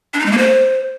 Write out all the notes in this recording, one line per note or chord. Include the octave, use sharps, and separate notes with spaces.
D4
D#4
G#3
A#3
C5